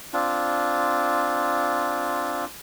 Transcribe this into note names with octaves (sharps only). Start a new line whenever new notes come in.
C4 D4 F4